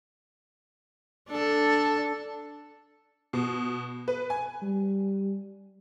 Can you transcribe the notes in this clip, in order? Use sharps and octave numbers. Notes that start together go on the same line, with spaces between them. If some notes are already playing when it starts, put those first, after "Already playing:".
D4 A4
B2
B4
G#5
G3